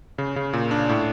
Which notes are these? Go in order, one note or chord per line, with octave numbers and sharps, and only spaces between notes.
C#3
C#3
A#2
D4
A2